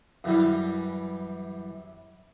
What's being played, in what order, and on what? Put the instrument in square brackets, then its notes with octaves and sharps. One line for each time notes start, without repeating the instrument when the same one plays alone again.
[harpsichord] F#2 E3 G3